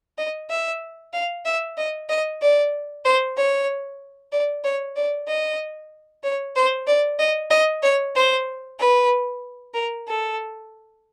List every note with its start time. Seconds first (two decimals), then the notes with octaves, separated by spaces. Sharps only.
0.18 D#5
0.50 E5
1.13 F5
1.45 E5
1.77 D#5
2.09 D#5
2.41 D5
3.05 C5
3.36 C#5
4.32 D5
4.64 C#5
4.96 D5
5.28 D#5
6.23 C#5
6.55 C5
6.87 D5
7.19 D#5
7.51 D#5
7.83 C#5
8.15 C5
8.78 B4
9.74 A#4
10.06 A4